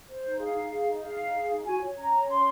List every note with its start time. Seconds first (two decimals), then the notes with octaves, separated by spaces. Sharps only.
0.09 C5
0.24 D#4
0.40 G#4 F5
0.55 D#4
0.71 G#4
0.86 D#4
1.02 G#4 F5
1.19 D#4
1.35 G#4
1.50 D#4
1.65 F#4 G#5
1.81 C#5
1.97 C#4 A#5
2.14 C#5
2.29 C#4 C6